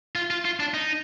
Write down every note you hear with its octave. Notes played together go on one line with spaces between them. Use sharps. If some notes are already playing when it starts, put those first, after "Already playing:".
F4
F4
F4
D4
D#4